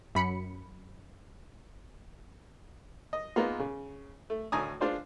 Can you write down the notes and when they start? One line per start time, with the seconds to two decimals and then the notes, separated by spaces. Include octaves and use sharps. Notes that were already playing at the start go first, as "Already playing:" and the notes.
0.15 F#2 B5 C#7
3.13 D#5
3.36 G#3 A#3 B3 D#4 F4
3.59 C#3
4.30 A3
4.52 D2 A2 A3 G#5 A#5 D#6
4.80 G#3 D4 F4 C5 D5